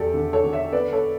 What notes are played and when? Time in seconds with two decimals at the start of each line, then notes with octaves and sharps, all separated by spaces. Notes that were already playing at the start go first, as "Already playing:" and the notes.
Already playing: E2 G4 A4 D5
0.14 D3
0.33 A4 C#5
0.43 D3
0.53 C#5 E5
0.73 B3 B4 D5
0.92 A4 C#5